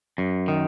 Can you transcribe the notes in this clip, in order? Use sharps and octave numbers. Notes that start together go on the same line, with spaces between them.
F#2
D#3